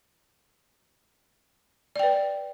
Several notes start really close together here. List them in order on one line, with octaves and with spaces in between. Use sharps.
D5 G5 B4